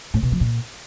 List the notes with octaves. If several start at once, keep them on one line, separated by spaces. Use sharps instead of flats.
A2
B2
F3
A#2